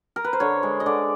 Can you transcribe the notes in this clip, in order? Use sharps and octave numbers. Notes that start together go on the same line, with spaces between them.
A#4
B4
C5
D3 C#5
G#3
D#5
D3 D5